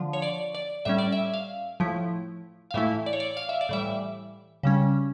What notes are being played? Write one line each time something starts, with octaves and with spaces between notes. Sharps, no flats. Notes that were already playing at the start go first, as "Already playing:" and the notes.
Already playing: D3 F3
C#5
D5
D5
A2 G3 C#4 E5
D5
E5
F5
A2 F3 A3 E4
F5
A2 E3 A3 E4 E5
D5
C#5
D5
F5
E5
D5
A2 E3 G3 E5
C#3 G3 C#4